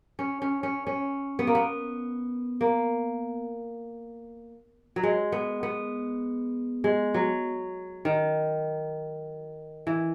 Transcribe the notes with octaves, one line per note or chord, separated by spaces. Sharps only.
C#4
C#4
C#4
C#4
B3
A#3
B3
A#3
F#3
G#3
B3
B3
G#3
F#3
D#3
E3